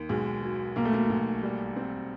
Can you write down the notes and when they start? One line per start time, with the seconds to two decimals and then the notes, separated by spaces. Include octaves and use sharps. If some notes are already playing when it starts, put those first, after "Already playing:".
Already playing: D#2
0.09 B1 G#3
0.43 F#3
0.76 B1 A#3
0.85 A3
0.94 A#3
1.10 B1
1.43 G3
1.76 C4